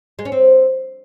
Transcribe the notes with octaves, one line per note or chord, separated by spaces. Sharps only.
G#3
C#4
C4